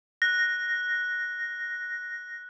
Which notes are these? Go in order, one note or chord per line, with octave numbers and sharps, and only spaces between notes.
F#6 A#6